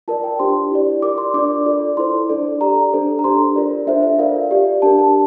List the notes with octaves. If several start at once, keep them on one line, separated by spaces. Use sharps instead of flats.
F4 A#4 D5 A5
G5
D4 G4 C5 C6
E4 G4 D5
F4 A#4 D5 D6
C6
D4 F4 A#4 D5 D6
F4 A4 D5
E4 A4 C5 C6
D4 A4 D5
G4 D5 A#5
D4 A4 C5
A#5
D4 G4 C5 C6
F4 A#4 D5
D4 F4 A4 C5 E5
E5
F4 A#4 D5 F5
G4 D5
D4 G4 A#4 A5
A5